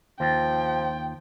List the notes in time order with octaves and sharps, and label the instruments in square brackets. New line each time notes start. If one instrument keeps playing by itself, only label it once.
[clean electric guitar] D#2 F4 [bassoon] F3 [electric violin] G5